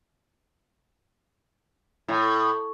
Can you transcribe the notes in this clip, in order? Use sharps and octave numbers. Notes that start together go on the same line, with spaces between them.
A2